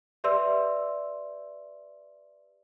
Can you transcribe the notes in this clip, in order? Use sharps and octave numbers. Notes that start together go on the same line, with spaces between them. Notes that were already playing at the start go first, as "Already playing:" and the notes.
G4 B4 D5 E5 C6 E6